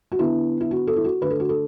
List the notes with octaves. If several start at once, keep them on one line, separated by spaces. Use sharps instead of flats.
F#4
D3 B3 E4
E4
F#4
A4
E4
F#4
D3 A3 B4
A4
F#4
A4